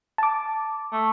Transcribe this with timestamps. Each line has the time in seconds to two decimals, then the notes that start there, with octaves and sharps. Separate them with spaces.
0.18 A5 D6
0.92 A3